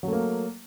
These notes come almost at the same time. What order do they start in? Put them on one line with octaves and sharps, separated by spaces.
F#3 A3 A#3